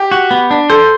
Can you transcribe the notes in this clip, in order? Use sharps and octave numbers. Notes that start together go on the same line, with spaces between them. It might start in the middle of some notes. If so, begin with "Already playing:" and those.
Already playing: G4
F#4
B3
D4
A4 C5